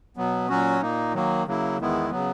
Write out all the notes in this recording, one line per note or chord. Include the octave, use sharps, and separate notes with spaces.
B2 F#3 B3
A#2 F#3 C#4 F#4
A#2 A#3 D#4
D#3 F#3 A#3
C#3 F#3 A#3 E4
E2 D#3 G#3 B3 E4
C#3 F#3 B3